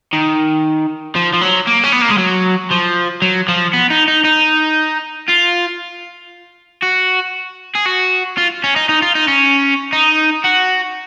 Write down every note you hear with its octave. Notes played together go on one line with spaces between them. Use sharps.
D#3
F3
F3
F#3
A#3
C#4
B3
A#3
G#3
F#3
F3
F#3
F3
B3
D#4
D#4
D#4
F4
F#4
G#4
F#4
F4
C#4
D#4
D#4
F4
D#4
C#4
D#4
F#4